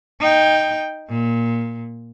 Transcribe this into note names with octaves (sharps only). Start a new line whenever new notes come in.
D#4 G5
A#2